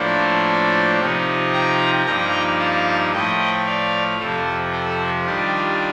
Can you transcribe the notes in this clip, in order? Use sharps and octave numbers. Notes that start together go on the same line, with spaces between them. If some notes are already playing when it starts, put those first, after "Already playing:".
Already playing: A2 F3 A#3 D4 A4 C5
C3 F3 C4 D#4
G5 A#5
G2 F3 A#3 D#4 G5 A#5
F5 A5
A2 F3 A3 D#5 G5
D5 F5
F2 C3 F3 A4 C5
A4 C5
D#3 G3 D4 F4 G4